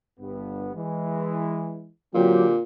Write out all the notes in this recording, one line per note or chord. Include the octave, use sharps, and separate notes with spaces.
G1 G2 B3
E3 G#3
A#2 D3 F#3 C4 G4